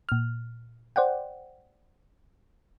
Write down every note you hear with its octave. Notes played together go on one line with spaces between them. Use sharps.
A#2 F6
C5 D5 F#5 G5